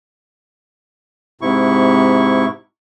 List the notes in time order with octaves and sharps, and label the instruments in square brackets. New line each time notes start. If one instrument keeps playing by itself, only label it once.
[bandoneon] G#2 C3 E4 C#6